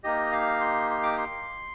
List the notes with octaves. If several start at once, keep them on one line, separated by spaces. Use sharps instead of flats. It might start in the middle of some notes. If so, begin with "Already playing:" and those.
A#3 D#4 G4 D#5
F5
C6
C6
D6
C6